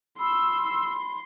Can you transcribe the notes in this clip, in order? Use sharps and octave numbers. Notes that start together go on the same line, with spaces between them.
B5 C6 E6